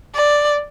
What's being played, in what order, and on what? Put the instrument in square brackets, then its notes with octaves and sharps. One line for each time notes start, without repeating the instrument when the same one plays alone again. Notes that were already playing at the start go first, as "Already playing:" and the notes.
[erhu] D5